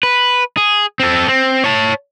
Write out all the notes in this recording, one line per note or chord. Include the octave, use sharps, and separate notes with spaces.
B4
G#4
C4 A4
C4
C#5 A5